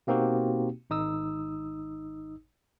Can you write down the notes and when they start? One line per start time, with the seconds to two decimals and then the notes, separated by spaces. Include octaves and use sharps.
0.07 B2 A#3 C4 D#4 F#4 G4
0.90 G#1 D#4 D#6 E6